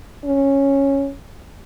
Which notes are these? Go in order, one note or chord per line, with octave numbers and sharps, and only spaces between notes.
C#4